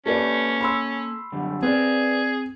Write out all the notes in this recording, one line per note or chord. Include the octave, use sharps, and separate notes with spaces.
A#3 C#4 G4 A4 B4 D5
B5 C6 E6
F#2 D3 G3
C4 G#4 B4 D5